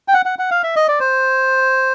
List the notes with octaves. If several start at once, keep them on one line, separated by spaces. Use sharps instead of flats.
G5
F#5
F#5
F#5
F5
E5
D#5
D5
C5